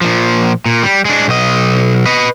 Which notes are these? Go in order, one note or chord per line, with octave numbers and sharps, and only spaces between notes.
A#2 F3
A#2
G3
G#3 D4
B1 D#5
B4 D#5